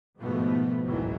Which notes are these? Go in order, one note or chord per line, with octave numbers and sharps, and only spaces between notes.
G#2 B2 D#3 F3 A3 B3
G#1 C#2 A2 D#3 E3 F#3